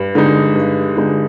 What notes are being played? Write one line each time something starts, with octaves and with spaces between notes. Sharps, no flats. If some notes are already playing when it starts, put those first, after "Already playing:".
Already playing: G2
D3 G#3 D#4
G2
D3 G#3 D#4